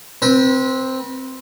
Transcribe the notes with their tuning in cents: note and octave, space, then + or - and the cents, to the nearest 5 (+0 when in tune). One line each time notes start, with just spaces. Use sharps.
C4 +0 B4 -30